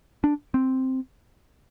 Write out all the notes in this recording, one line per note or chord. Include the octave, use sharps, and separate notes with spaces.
D4
C4